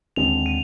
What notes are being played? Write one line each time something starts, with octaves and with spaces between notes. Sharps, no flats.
D#2 D3 G#3 C4 F7
D#7